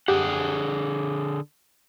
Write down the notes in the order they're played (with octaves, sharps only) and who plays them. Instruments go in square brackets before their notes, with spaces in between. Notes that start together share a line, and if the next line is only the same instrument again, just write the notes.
[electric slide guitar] D3 G#4 F#5 [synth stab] G4